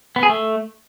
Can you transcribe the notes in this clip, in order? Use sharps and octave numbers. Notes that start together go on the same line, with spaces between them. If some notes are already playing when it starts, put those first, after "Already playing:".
B3
G#4
A3